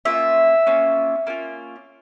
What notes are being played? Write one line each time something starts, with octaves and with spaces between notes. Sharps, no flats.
A#3 C#4 F4 E5
A#3 C#4 F4
A#3 C#4 F4